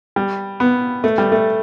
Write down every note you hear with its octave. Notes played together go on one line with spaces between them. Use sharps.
G3
B3
A3
G3
A3